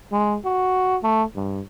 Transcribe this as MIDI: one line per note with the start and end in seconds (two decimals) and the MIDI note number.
0.12 0.37 56
0.45 0.97 66
1.03 1.23 57
1.35 1.61 43